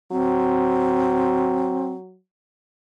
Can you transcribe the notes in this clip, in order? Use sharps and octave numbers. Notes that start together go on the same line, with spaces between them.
F#3 C4